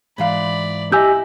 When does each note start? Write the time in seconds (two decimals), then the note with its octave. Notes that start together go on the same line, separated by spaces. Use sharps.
0.18 G#2 E3 D5 F5 B5
0.92 E4 G4 D#5 G#5 E6 G6